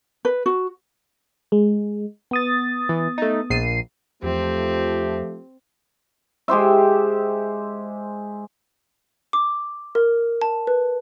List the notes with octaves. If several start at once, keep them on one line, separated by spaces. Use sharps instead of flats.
B4
F#4
G#3
B3 D#6 A6
E3
A3 D#4
A#1 C7 D#7
E2 F3 A3 C4 G4
G#3 G4 C5 E5
D6
A#4
A5
B4